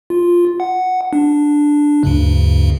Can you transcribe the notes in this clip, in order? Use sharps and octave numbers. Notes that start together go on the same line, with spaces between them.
F4
F#5
D4
D2 G2 C#3